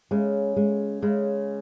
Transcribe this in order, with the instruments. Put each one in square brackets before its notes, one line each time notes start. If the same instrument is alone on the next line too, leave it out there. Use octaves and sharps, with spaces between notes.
[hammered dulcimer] C#3 [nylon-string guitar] G#3
[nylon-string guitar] G#3
[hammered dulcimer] C#3 [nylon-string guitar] G#3